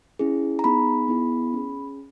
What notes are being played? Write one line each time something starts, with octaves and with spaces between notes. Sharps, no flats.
C#4 E4 G#4
A#5
B3 D#4 G#4 B5
B3 E4 G#4
C#4 G#4